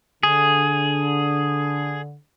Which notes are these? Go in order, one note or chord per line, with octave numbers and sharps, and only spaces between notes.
D3 G#4